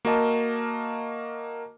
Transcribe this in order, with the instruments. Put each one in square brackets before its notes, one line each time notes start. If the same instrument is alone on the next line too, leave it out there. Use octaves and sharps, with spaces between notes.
[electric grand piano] A#3 F#4 A#4 D#5 A5